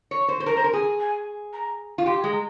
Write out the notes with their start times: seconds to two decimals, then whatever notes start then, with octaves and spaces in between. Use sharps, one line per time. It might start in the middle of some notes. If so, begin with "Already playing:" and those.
0.11 C#5
0.28 C5
0.40 C5
0.46 A#4 A#5
0.57 C5
0.64 A#4
0.73 G#4
0.99 G#5
1.52 A#5
1.98 F4
2.06 G4 C6
2.24 G#3
2.32 A#5